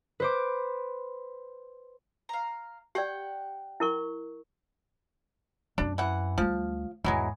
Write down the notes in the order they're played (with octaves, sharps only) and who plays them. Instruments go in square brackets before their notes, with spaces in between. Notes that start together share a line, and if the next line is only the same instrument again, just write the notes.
[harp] B4 C5 D6
[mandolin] F5 A#5
[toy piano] G4 D5 [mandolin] F#5 G5
[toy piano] E4 A#4 C#6
[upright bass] F#2 C4 [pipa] D4
[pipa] E3 F#5
[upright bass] D2 G3 [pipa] F3
[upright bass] E2 G#2 [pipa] E3 F#3 G#3